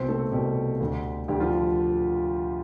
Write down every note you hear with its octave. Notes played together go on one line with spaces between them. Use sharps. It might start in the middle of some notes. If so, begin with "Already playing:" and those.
Already playing: C2 B2 C4 C5
A3 A4
C2 B2 G3 G4
D2 D3
D2 D3 G3 G4
F3 F4